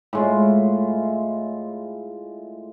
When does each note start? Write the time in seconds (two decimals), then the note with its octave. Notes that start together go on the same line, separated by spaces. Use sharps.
0.13 A2 G#3 F4